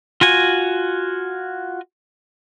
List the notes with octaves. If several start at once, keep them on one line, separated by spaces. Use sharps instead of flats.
F4 F#4 G#5